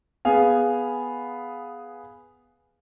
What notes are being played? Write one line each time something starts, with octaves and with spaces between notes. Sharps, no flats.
B3 G#4 F5 G#5